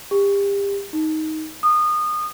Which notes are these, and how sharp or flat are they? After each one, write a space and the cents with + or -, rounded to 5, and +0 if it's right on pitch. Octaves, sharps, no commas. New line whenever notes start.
G4 +30
D#4 +10
D#6 -25